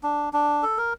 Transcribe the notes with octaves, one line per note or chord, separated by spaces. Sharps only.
D4
D4
A4
A#4